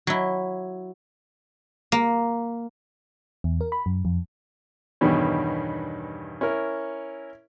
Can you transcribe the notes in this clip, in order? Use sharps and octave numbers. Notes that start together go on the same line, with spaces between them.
F#3 E4
A#3
E2
A#4
B5
F#2
F2
E2 G2 B2 D#3 G3 C#4
C#4 E4 A#4